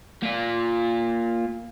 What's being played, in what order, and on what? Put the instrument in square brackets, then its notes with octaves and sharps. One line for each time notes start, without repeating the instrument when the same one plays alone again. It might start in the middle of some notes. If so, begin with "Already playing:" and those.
[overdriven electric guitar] A#3 F4